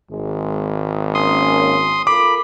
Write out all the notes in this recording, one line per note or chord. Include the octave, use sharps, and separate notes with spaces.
G#1 G#3
A#3 C#4 C6 D#6
F4 A4 A#4 B5 D6